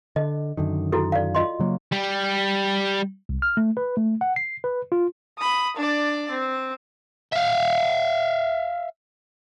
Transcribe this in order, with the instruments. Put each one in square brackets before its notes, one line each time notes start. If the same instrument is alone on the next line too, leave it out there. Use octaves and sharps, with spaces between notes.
[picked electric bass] D3 [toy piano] D#5
[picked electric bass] F#2 D3 D#3
[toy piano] E4 F#4 A4
D5 F5
F4 D#5 C6
[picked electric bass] C#3 F#3 A#3
[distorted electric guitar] G3
[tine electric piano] C2
F6
A3
B4
A3
F#5
C7
B4
F4
[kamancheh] B5 D#6
D4 D5
C4
[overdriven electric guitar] E5 F5